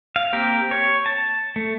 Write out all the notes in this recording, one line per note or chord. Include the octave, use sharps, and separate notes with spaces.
F5
A#3 C4 G4 A#4
C#5
A5
A3